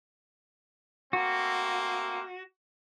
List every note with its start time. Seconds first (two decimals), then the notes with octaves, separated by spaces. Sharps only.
1.13 A3 A#3 C4 F#4